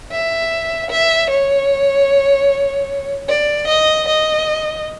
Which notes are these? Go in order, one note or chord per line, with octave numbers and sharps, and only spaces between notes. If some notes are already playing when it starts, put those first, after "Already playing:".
E5
E5
C#5
D5
D#5
D#5